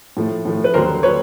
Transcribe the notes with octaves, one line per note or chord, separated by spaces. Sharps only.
A2 F3 A3
A2 F3 A3
B4
D#2 D3 F#3 A#4 C5
D3 F#3 B4 C#5